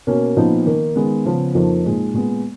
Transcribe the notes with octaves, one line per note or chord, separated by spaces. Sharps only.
B2 A#3 C#4
A#2 F3 B3 D#4
D#3 A#3 D#4
D#3 G#3 B3
C#3 F3 B3
F2 F3 A#3 D#4
A#2 G#3 D#4
A#2 G#3 B3